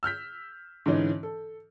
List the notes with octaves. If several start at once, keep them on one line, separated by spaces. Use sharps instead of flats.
E6 F6 G6 B6
G#2 D3 E3 C#4 D#4
A4